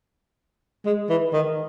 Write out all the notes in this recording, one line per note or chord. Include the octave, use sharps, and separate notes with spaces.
G#3
E3
D#3